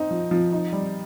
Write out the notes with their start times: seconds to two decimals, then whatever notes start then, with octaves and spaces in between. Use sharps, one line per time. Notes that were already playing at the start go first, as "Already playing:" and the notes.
Already playing: C4 D#4
0.11 F3
0.31 F3
0.52 D#4
0.72 G3